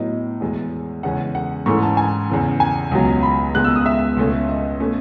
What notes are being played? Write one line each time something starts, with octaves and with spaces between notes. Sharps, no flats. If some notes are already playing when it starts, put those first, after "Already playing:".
Already playing: A2 F#3 B3 D#5
E2 B2 G#3
E2 C#3 G#3 C#4 F#5
F#5
G#2 E3 A3 C#4 C#6
A5
G#5
E2 C#3 E3
G#5
C#2 B2 F#3
B5
C#2 B2 G#3 B3 F#6
E6
D#6
E5
C#2 B2 A3 C#4
D#5
B2 A3 C#4